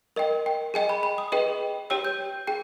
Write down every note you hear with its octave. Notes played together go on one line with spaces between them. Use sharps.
A#4 D#5 G5
G5
G#4 D#5 G5 G#5
B5
B5
D#6
G#4 B4 D#5 G5
G4 C#5 G5 E6
G6
G#4 G5